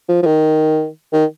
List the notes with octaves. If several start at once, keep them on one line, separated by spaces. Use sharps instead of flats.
F3
F3
D#3
D#3